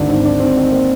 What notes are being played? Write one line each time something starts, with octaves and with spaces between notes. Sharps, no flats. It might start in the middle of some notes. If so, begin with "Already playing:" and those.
Already playing: G#1 D2 D4
G#2 C4
G#1 D4
G#2 C4
D#3 C4
A#3 C4